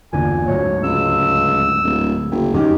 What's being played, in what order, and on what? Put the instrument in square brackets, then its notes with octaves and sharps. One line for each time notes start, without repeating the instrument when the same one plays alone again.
[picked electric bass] G1 E2 D3 [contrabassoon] A#2 [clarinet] G#5
[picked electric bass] D2 G#2 F#3 [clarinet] C#5
[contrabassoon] C#2 [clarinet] E6
[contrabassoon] D1
F#1
[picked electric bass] F#2 F#3 C#4 [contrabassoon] D#3 [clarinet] G4